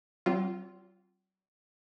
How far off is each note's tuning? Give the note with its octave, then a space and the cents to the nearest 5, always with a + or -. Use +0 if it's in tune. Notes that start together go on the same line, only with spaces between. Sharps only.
F#3 +45 C4 +0 F4 +0